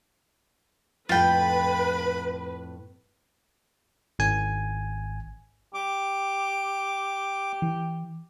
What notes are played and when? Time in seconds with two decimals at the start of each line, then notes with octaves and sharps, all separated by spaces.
1.09 F2 A2 F4 B4 G5 B5
4.19 G#1 G#5
5.74 G4 D6
7.62 E3